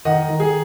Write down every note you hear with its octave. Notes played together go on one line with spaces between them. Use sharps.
D#3 D#5 F#5
D#3
G#4